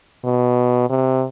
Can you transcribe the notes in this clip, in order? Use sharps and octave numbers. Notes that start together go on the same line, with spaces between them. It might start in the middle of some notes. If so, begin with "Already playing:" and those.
B2
C3